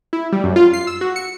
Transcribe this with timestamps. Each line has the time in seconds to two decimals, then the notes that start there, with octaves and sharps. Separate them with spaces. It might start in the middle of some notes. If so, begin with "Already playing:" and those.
0.13 E4
0.32 G3
0.44 F#2
0.56 F4
0.73 C7
0.87 E6
1.01 F#4
1.16 C#7